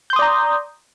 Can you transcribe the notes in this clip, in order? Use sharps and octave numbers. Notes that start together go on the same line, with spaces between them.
D5 A#5 C6 D#6 G6